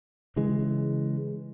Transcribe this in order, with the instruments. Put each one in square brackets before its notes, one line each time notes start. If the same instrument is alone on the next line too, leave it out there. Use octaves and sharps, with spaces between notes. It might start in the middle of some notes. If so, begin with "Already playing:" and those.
[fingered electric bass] C#3 E3 G#3